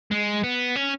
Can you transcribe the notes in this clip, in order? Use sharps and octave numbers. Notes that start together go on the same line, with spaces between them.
G#3
B3
C#4